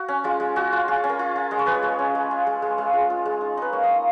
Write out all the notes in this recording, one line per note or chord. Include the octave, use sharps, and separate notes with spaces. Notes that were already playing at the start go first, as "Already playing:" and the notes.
Already playing: F#4
C#4
G#3 F4
G#3
G#3 F#4
F4
F4 G#4
C#4
A#4
F4
F4
G#3 D#5
C#5
G#3 B4
C#5
G#3
C#4
G#3
F4
G#3
G#3
G#3 F5
F4
F4
G#3
D#4
D#4 B4
A#3 C#5
D#5
D#4
F5